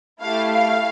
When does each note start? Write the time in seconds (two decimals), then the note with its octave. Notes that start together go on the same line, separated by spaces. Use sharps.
0.20 A3 E4 G4 F5
0.52 F5